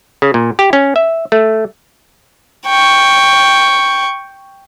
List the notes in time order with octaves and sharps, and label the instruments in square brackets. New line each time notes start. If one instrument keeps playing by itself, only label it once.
[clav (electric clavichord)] C#3
A#2
G4
C#4
E5
A3
[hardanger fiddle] G5 C#6